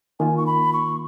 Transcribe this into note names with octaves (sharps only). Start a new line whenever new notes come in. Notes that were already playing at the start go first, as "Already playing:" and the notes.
D#3 A#3 F4 G#5
C#6
B5
C#6